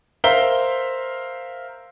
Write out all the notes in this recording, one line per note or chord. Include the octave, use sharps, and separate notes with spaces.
A#4 C5 E5 F5 G7